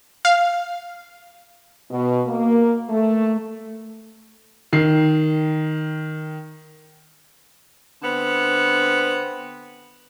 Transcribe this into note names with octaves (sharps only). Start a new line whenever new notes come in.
F5
B2
A#3
A3
D#3 C7
D3 B3 C4